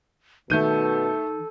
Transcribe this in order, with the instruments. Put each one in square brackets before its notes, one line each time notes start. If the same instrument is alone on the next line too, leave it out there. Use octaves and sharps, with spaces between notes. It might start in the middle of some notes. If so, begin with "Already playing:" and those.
[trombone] B2 [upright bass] D#3 [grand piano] A3 G6 D#7 [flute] A4